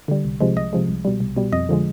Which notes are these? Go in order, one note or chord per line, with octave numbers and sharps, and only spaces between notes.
D3 G3
C2
C3 F3 G#3
C2 D#5
C3 F3 G#3
C2
B2 G3
C2
B2 G3
F2 D#5
D3 F3 G#3